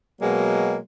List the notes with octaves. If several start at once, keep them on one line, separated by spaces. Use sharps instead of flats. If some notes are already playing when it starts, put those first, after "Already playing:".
B2 F#3 G#3 A#3